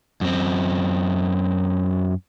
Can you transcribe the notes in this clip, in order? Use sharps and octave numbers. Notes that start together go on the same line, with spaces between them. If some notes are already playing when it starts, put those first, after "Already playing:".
F#2 C4